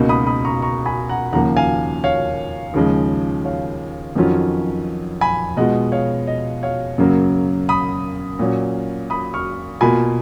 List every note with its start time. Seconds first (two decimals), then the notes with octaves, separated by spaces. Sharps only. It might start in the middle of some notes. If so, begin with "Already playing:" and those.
Already playing: C#2 B2 A#3 D#4
0.09 B5 D#6
0.27 B5 D#6
0.45 A#5 C#6
0.62 A#5 C#6
0.85 G#5 B5
1.09 F#5 A#5
1.33 D#2 C#3 F3 A#3 F#5 A#5
1.57 F5 G#5
2.04 C#5 F5
2.74 D#2 C#3 F3 G#3
3.45 C#5 F5
4.15 F2 D#3 F#3 C#4 F4
5.21 G#5 B5
5.57 B2 G#3 B3 F4 D#5 F#5
5.92 C#5 F5
6.27 D#5
6.63 C#5 F5
6.98 F#2 C#3 F#3 A#3
7.69 B5 D#6
8.39 A#2 F#3 C#4
9.10 B5 D#6
9.34 C#6 F6
9.81 B2 A#3 F4 G#5 B5